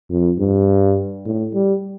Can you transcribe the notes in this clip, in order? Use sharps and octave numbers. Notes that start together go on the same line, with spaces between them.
F2
G2
A2
G3